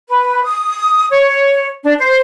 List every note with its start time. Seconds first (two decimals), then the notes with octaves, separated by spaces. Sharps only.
0.09 B4
0.45 D#6
1.11 C#5
1.83 D4
1.99 C5